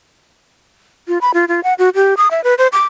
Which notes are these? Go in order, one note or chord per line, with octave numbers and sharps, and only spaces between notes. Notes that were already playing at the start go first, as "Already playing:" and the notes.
F4
B5
F4
F4
F#5
F#4
G4
D#6
E5
B4
C5
D6